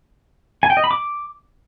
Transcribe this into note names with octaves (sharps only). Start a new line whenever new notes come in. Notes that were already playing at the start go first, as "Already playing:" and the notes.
G#5
G5
D#5
B5
D6